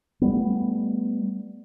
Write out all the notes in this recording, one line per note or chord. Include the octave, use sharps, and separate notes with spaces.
G3 A3 B3